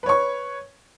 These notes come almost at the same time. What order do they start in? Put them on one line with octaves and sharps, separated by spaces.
B4 C#5 C#6